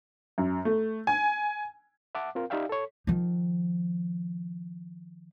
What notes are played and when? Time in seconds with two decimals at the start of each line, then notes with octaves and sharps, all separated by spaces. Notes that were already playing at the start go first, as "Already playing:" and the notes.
0.38 F#2
0.65 A3
1.07 G#5
2.15 E5 F#5 A5 D6
2.35 C4 F4 A#4 F5
2.50 D#4 G4 D5 E5 F5 G5
2.69 A4 C#5
3.07 D#3 F3